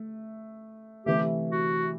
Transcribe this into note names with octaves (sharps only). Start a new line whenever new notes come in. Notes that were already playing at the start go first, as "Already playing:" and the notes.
Already playing: A3
C3 E3 A3 G4
F#4